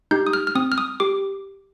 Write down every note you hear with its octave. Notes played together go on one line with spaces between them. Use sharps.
D#4 G4 G6
D#6
F6
F6
C4 D#6
F6
D#6
G4 D6